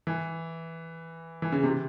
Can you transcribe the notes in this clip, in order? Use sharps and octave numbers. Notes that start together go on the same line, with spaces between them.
E3
E3
C#3
C3